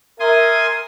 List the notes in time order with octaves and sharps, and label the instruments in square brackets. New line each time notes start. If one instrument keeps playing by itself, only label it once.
[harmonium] A#4 [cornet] E5 [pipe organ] G#5 C6 D#6